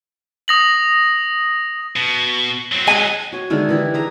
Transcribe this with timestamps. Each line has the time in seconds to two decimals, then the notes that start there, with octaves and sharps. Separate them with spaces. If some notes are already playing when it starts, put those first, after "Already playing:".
0.48 D#6 A#6 F#7
1.96 B2
2.72 F#3 C4
2.87 G#3 G#5
3.32 F#4 C#5
3.50 D3 D#3 G#3 E4
3.69 E3 E4 G4
3.94 G#4 E5 A#5